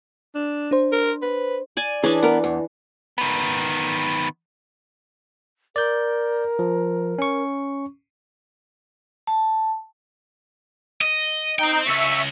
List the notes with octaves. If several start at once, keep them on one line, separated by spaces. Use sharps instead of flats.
D4
D4 C5
A#4
B4
D5 G#5
E3 C#4 D4 G#4
B3 A#4
E2
D#3 B3
A#4 D5 G6
F3
C#4 C#6
A5
D#5
D#4 C5 G5
C#2 E5 C#6